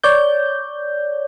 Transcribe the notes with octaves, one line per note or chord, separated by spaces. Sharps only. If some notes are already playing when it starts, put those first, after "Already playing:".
C#5 D5 G6